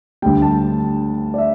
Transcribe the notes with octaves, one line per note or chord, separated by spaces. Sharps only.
D2 D3 G3 G5
A5
D5
E5